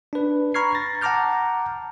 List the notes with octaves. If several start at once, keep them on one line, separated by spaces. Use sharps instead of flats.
D4 B4
A#5 B5 C#6 F6 G#6 C7
A6 A#6
F#5 A5 A#5 D6 F6 G6